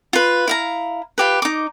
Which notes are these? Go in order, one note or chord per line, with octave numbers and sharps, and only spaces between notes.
F4 B4
E4 F5 A#5
F4 G4 B4
D#4 D6